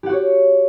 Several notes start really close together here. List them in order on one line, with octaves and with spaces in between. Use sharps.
G4 F#5 F#4 C#5